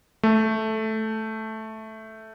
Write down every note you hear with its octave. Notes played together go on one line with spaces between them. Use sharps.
A3